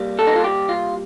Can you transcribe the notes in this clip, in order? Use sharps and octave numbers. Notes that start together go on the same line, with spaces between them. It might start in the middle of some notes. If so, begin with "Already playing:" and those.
Already playing: C3 G3 A#3
A4
D#4
F4
G4
F4